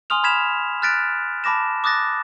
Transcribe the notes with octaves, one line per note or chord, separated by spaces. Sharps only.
G#5 C6 D#6 F6 F7
B5 F6 G#6 B6 E7 F7
F6 F#6 A6 B6 D7
A5 B5 D6 A#6 E7
D6 D#6 F#6 A6 A#6